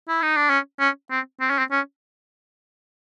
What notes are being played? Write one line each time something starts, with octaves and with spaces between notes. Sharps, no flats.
E4
D#4
D4
C#4
C#4
C4
C4
C#4
C4
C#4